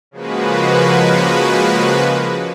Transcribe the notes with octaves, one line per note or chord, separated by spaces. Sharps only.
C#3 F3 G#3 A#3 F#4 B4